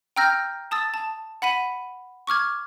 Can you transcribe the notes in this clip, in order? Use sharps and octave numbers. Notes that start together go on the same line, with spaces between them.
G5 A#5 E6 F6 G6 A#6
A5 D#6 E6 A6
A5
F#5 B5 B6 D#7
C#6 D6 F6 G#6